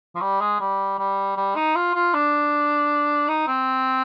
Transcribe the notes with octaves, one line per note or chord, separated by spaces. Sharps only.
F3
G3
G#3
G3
G3
G3
D#4
F4
F4
D4
D#4
C4